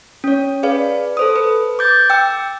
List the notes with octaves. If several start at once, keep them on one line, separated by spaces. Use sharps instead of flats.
C#4 C#5
G#4 B4 D5 F5
A4 C5 D#6
B4
D6 G6 A6
G5 D6 E6